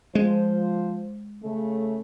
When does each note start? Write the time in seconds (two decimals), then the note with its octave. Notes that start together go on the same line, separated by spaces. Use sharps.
0.15 F3 G#3 C5
1.43 C#3 A3